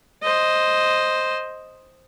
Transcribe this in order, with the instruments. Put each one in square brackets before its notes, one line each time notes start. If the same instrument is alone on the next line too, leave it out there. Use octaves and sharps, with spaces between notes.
[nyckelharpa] C5 D#5